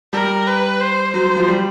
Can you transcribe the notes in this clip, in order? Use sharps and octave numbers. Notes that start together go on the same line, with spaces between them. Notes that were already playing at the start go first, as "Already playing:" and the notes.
G3 A#4
B4
C5
F#3 C5
F#3
F3
G3